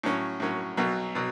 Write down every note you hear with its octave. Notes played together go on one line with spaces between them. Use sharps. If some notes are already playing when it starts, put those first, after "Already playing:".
A2 F#3 C#4
A2 F#3 C#4
B1 B2 F#3
B2 F#3